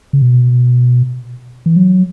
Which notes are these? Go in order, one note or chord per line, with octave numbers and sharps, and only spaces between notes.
C#3
B2
E3
F#3